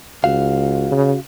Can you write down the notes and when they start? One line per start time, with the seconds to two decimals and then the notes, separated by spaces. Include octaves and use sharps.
0.24 C#2 F#4 F5
0.91 C#3